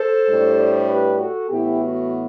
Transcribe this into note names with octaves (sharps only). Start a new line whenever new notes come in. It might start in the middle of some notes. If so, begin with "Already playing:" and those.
Already playing: A4 C5
A2 G3 D4
G4 B4
F#4 A4
A2 E3 B3 E4 G4
F#4